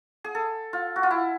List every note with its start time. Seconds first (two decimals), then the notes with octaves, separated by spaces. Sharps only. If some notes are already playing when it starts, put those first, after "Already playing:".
0.24 G#4
0.35 A4
0.73 F4
0.96 F#4
1.03 F4
1.11 E4